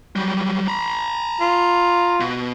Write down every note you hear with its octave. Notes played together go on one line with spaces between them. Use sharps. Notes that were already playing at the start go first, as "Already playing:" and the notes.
F#3 G3
A#5 B5
F4
B2